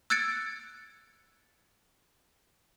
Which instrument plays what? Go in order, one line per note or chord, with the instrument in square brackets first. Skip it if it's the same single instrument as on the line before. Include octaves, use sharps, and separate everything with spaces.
[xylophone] E6 F#6 G#6 A6 C#7 D7